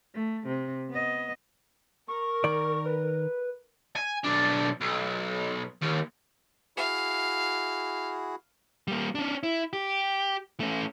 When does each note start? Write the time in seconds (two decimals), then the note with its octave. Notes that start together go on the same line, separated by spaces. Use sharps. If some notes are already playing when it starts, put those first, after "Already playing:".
0.14 A3
0.47 C3
0.90 B3 D#5
2.08 A#4 C#6
2.44 D#3 D5
2.86 B4
3.96 G#5
4.24 B1 D4
4.81 B1
5.81 D#2
6.77 E4 F#4 G#4 F5
8.88 G3 A#3
9.15 C#4 D4
9.43 E4
9.73 G4
10.60 A3 C#4